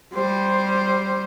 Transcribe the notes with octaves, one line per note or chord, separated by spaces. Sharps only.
G3 C5